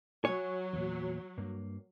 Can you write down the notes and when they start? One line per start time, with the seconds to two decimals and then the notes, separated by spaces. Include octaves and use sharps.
0.25 F#3 C#5 G#5
0.73 E2 A#2
1.38 G2 A#3